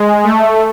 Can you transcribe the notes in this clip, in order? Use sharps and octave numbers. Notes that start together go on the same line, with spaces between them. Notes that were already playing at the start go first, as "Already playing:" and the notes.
Already playing: G#3
A3